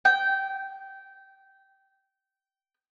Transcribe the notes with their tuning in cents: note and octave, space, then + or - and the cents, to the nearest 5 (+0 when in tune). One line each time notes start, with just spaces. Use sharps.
G5 -15